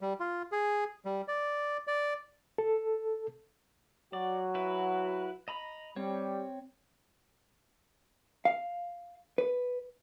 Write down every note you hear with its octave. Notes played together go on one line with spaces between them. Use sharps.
G3
F4
G#4
G3
D5
D5
A4
F#3 F#4 D5
E4 B4
D#5 A#5 B5
G3 C4 C#5
F5
B4